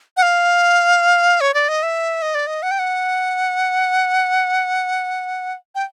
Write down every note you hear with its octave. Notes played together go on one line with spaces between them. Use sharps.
F#5
F5
C#5
D5
D#5
E5
D#5
D5
D#5
F#5
G5
F#5
G5